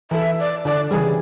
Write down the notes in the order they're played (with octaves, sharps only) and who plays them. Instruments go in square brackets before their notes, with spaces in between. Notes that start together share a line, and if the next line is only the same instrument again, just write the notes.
[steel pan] E3 A4 [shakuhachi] E5
[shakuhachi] D5
[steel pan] D3 [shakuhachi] D5
[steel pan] C#3 E3 G3 [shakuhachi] G#4